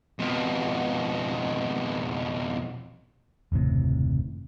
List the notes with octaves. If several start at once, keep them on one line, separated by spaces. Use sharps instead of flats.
F2 B2
F#1 D#2 A2 C3